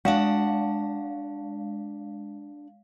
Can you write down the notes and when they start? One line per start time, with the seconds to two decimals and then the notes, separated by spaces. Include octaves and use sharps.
0.05 G#3 D4 F5 F#5